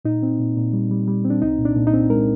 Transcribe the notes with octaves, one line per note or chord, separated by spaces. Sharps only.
A#2 D#4
C4
A#2
A#2
G3
G3
G3
C4
D4
C2 D#4
A#2
D4
A#2
D#4
C4
G#3 A#4